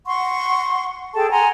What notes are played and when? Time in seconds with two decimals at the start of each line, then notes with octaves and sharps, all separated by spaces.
0.07 F#5 C6 C#6
1.15 G#4 A4 G5 A5
1.30 F#5 G#5 A#5 C6